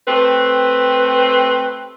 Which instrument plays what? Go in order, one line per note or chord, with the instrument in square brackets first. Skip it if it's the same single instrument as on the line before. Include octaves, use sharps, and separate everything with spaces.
[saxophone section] A3 C4 G4 B4